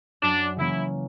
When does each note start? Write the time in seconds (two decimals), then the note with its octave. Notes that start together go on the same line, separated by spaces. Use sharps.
0.22 F#2 D4
0.56 C#3 E3 A#3 C#4 E4